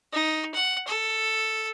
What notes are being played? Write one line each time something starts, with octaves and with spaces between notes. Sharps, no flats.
D#4
F#5
A4